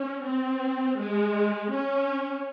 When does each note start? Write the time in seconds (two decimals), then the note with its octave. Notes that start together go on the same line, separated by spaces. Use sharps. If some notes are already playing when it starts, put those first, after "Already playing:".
Already playing: C#4
0.24 C4
0.98 G#3
1.72 C#4